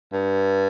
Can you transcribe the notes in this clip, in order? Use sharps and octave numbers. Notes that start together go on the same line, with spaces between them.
G2